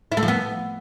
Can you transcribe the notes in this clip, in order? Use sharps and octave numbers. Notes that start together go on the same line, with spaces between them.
E4
A3
F3
B3